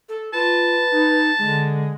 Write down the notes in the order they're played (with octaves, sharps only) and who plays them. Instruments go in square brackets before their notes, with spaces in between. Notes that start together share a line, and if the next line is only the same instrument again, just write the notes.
[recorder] A4
[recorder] F4 [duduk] B4 [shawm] A5
[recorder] D#4
[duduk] D3 [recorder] G#3